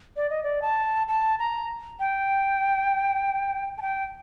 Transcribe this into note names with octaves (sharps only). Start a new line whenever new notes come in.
D5
D#5
D5
A5
A5
A#5
G5
A5
G5